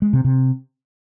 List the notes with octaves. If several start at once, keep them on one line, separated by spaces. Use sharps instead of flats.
G#3
C3
C3